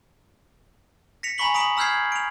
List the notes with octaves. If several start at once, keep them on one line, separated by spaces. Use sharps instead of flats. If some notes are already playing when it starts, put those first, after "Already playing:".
A#6 B6 C#7 F7
G#5 A#5 B5 C#6 B6 F#7
A#5 D#6 B6 D7 F7 F#7
A#5 E6 F6 G6 G#6 C7
D7 F7